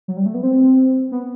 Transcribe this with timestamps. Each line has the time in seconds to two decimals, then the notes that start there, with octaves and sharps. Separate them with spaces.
0.08 F#3
0.17 G3
0.26 A3
0.34 B3
0.43 C4
1.12 B3